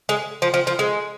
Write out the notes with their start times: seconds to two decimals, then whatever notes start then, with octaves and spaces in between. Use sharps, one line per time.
0.09 G#3
0.42 F3
0.54 F3
0.67 F3
0.79 G#3